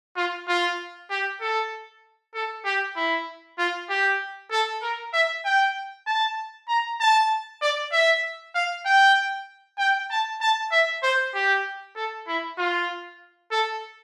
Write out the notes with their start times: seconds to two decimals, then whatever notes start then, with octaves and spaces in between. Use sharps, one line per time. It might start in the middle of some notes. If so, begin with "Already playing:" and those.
0.17 F4
0.48 F4
1.10 G4
1.41 A4
2.34 A4
2.65 G4
2.96 E4
3.58 F4
3.89 G4
4.51 A4
4.82 A#4
5.13 E5
5.45 G5
6.07 A5
6.68 A#5
7.00 A5
7.62 D5
7.92 E5
8.55 F5
8.86 G5
9.78 G5
10.10 A5
10.41 A5
10.72 E5
11.03 C5
11.35 G4
11.96 A4
12.28 E4
12.58 F4
13.51 A4